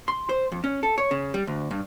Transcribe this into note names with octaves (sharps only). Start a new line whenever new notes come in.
C6
C5
F2
C#4
A4
C#5
C#3
G3
D2
G2